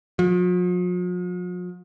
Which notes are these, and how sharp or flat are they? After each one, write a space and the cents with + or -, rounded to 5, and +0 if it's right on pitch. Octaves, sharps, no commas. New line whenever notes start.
F3 +45